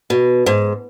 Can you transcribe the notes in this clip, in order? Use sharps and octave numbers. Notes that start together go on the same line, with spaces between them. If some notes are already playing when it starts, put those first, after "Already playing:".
B2
G#2